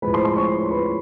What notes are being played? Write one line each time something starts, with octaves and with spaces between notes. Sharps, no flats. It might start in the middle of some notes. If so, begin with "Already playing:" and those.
A2 F3 G#3 B4 B5
C5 C6
C5 C6
C#5 C#6
B4 B5